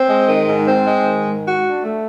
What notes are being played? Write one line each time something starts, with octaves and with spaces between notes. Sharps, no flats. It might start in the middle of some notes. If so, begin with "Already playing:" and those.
Already playing: C4
G#3
D#3
G#2
C4
G#3
D#3
G#2
F#4
D4
A3